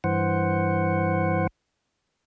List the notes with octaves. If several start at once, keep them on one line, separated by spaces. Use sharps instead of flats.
G2 E3 C5 F#5